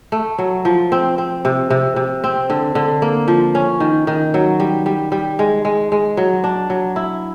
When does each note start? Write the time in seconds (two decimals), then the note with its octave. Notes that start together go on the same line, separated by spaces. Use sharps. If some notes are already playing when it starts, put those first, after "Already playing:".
0.12 A3
0.38 F#3
0.65 F3
0.92 C4
1.18 C4
1.45 C3
1.70 C3
1.96 C3
2.24 C4
2.50 D3
2.75 D3
3.02 A#3
3.28 F3
3.55 C#4
3.80 D#3
4.07 D#3
4.34 F#3
4.60 G3
4.86 G3
5.12 G3
5.39 G#3
5.65 G#3
5.92 G#3
6.17 F#3
6.44 D4
6.70 F#3
6.96 E4